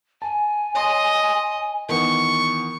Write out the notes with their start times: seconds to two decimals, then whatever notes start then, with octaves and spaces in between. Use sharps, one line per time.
0.22 G#5 A5
0.75 C#5 D#5 C6
1.89 D#3 E3 B3 C#6